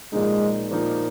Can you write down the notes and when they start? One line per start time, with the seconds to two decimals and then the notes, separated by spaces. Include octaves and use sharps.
0.13 A#2 F3 G#3 A#3 D#4
0.71 A#2 F3 A#3 D#4